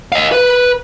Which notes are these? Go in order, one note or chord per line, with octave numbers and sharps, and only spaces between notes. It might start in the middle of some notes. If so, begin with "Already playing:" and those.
D#5 F5
B4